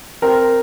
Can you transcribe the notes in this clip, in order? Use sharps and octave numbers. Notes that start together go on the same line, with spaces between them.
C4 A#4